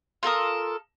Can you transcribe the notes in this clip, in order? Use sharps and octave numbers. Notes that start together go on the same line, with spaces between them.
F4 A4 A#4 D#6